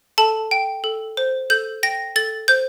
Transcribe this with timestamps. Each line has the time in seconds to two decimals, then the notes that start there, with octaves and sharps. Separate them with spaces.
0.18 A4 A5
0.51 G5
0.84 A4
1.17 C5
1.50 A4 G6
1.83 G5 A#6
2.16 A4 A6
2.48 C5 G6